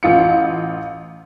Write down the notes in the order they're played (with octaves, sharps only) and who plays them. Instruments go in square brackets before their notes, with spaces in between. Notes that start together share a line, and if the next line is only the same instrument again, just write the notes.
[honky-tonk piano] A1 F4 C#7